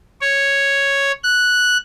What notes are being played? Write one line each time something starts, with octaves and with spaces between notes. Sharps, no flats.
C#5
F#6